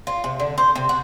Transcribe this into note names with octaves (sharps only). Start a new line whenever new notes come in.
F4
C3
D3
C5
C3
F#4